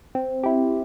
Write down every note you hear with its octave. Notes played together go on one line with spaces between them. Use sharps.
C4
E4 G4